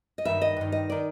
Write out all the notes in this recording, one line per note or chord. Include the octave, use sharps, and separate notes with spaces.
D#5
G2 D#3 E5
D#5
G2 D#3
D#5
D#3 D5